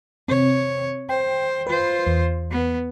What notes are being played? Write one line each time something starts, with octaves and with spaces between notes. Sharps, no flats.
C3 C4 C#5
C5 G5
F4 B4 C5
E2
B3